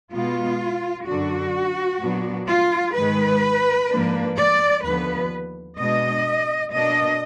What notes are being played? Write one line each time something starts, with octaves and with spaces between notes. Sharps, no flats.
B2 G#3 B3 F4
F#2 D3 F#3 D4 F#4
A#2 F#3 B3 D4
F4
G#2 D#3 G#3 B4
G#2 F3 A#3 D4
D5
D#2 D3 F3 B3 B4
B2 G#3 D4 D#5
B2 A#3 D4 D#5